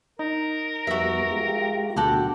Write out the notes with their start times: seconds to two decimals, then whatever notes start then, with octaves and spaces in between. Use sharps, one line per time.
0.19 D#4 A#4
0.87 F2 G3 B3 F#4 E5
1.31 G#3 F4 G4
1.96 D2 B2 F#3 G4 A4 F#5